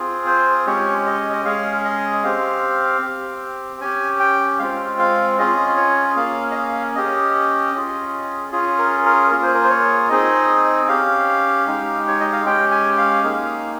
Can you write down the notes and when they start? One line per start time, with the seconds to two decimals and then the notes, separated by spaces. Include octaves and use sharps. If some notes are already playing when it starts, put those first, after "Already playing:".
Already playing: C4 F4 G#4
0.26 C5
0.66 G#3 C#4 G4 C#5
1.06 D#5
1.21 C#5
1.33 D#5
1.45 G#3 C#4 G#4 F5
1.85 D#5
2.24 C4 G4 F5
3.02 C4 G4
3.80 C#4 G4 G#5
4.20 G5
4.59 G#3 C4 F4 F5
4.99 F5
5.39 C#4 F4 G#4 D#5
5.77 C#5
6.16 A#3 C#4 G#4 F5
6.51 D#5
6.56 F5
6.95 C#4 G4 D#5
7.74 C#4 F4 G#4
8.52 C#4 F4 G#4
8.78 A#4
9.05 A#4
9.31 A#3 F4 G#4 A#4
9.43 C5
9.54 A#4
9.64 C5
9.70 C#5
10.10 C4 D#4 G#4 D#5
10.89 C#4 G4 F5
11.67 G#3 D#4 G4
12.08 C#5
12.20 D#5
12.33 F5
12.45 G#3 C#4 G4 G5
12.71 G#5
12.98 F5
13.24 A#3 D#4 G#4